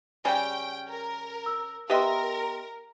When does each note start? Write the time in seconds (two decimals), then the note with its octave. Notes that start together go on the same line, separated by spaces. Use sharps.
0.25 C#3 G3 C#4 G5
0.89 A#4
1.46 E6
1.90 B3 G4 A#4 D#5 E5 G5 C6